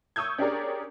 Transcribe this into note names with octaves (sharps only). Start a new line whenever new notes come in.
C#6 D#6 E6 G6 G#6
C#4 D4 G4 G#4 A#4 D5